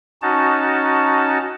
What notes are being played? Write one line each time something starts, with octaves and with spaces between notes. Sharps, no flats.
C#4 D#4 F#4 A5